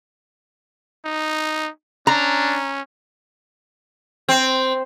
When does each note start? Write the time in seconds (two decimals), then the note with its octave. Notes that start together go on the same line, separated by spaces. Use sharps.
1.06 D#4
2.07 C#4 D4 A#5
4.29 C4